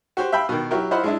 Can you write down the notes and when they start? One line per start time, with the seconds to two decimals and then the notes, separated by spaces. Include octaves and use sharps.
0.17 F#4 G4 C5
0.32 E5 F5 G5 B5
0.49 B2 D#3
0.71 F#3 E4 F#4 G4 A#4
0.91 E4 F4 C5 D#5 F#5 B5
1.04 G#3 D4 E4